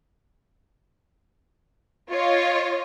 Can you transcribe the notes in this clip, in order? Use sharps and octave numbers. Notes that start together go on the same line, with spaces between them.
F4 C#5 D#5